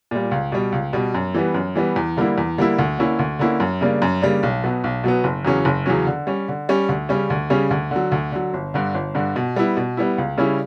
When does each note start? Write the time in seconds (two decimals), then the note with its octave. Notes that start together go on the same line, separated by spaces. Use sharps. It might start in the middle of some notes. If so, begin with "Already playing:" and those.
0.11 A#2 G3
0.31 C#2
0.52 B2 G3
0.72 C#2
0.93 B2 G3
1.14 F#2
1.34 E3 G3 B3
1.54 F#2
1.75 E3 G3 B3
1.96 E2
2.17 D3 G3 A#3 E4
2.38 E2
2.58 D3 G3 A#3 E4
2.79 D2
2.98 D3 A#3 C#4 E4
3.19 D2
3.39 D3 A#3 C#4 E4
3.60 F#2
3.81 C#3 G3 A#3 D4
4.02 F#2
4.22 C#3 G3 A#3 D4
4.43 B1
4.64 B2 F#3 B3
4.84 B1
5.04 B2 F#3 B3
5.24 F#1
5.45 E2 C#3 F#3 C#4
5.65 F#1
5.86 E2 C#3 F#3 C#4
6.07 D3
6.27 G3 C#4
6.48 D3
6.69 G3 C#4
6.89 D2
7.09 C#3 G3 C#4
7.30 D2
7.50 C#3 G3 C#4
7.71 D2
7.91 D3 F#3
8.12 D2
8.32 D3 F#3
8.54 G1
8.74 G2 D3
8.94 G1
9.15 G2 D3
9.36 B2
9.56 G3 B3 E4
9.77 B2
9.97 G3 B3 E4
10.18 C#2
10.38 C#3 G3 C#4 E4